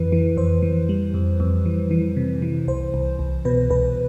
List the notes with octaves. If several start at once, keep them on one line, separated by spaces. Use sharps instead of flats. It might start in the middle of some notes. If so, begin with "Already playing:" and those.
Already playing: F2 E3 B4
E3
F2 C5
E3
G3
F2
F2
E3
E3
C3
E3
C2 C5
C2
C2
B2 B4
C2 B4